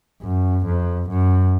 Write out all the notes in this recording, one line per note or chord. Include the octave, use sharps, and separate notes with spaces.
F#2
F2
F#2